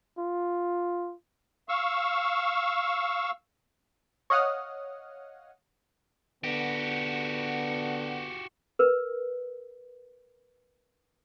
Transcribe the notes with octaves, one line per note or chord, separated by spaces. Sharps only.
F4
F5 C#6 E6
C#5 D#5 F5 F#5 D#6 F6
D3 B3 F#4 G4
A#4 B4